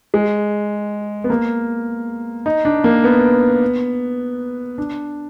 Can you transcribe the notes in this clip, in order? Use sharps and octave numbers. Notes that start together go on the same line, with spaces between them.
G#3
B3
A#3
D#4
D4
A#3
B3
D4